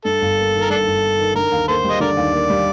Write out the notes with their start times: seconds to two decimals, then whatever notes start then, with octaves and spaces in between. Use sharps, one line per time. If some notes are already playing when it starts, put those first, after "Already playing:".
0.05 G2 A4
0.22 G1
0.38 A#3
0.54 D#3
0.61 A#4
0.70 G2 D4 A4
0.87 G1
1.03 A#3
1.19 D#3
1.35 D3 A#4
1.52 D#2
1.68 A#3 A4 C5
1.84 G3
1.90 D#5
2.00 D3 A#4 D5
2.17 D#2
2.34 A#3
2.50 G3